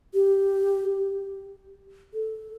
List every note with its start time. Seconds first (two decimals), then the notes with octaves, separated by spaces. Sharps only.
0.14 G4
2.14 A4